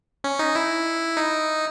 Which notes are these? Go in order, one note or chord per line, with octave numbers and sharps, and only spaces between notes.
C#4
D#4
E4
D#4